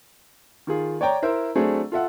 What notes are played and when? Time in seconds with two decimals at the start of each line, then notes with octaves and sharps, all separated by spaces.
0.67 D#3 F4 G#4
1.01 C#5 D5 G5 A#5
1.22 E4 A#4 C5 E5
1.56 F#3 A3 C4 D4 G#4
1.92 F4 A4 E5 F#5